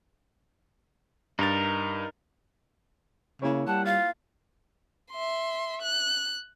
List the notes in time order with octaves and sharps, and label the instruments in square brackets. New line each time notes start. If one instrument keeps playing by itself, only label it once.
[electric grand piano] G2 A6 [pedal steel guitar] D#4 A#4
[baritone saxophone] C#3 [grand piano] A#3 E4 C#5
[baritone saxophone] G3 [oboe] F#5 [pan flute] A5
[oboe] F4 [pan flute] F5
[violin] E5 C6
F#6